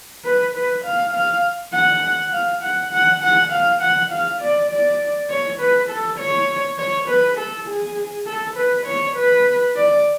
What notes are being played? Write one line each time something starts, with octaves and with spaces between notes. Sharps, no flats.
B4
B4
F5
F5
F#5
F5
F#5
F#5
F#5
F5
F#5
F5
D5
D5
C#5
B4
A4
C#5
C#5
B4
A4
G#4
A4
B4
C#5
B4
D5